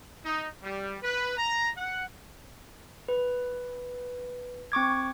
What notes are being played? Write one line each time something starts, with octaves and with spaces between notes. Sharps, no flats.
D#4
G3
B4
A#5
F#5
B4
C4 C#6 D6 G#6